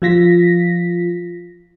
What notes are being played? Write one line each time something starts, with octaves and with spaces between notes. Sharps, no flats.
F3 F4 A#6 B6